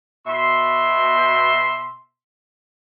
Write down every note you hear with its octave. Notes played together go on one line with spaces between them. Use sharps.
B2 E5 C6